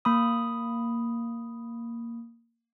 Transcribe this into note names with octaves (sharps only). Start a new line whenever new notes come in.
A#3 B5 D#6